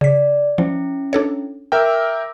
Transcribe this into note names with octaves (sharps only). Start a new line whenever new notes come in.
C#3 D5 B6
F3 C#4 E4
D4 A4 C#5
A#4 E5 G5 D6 E6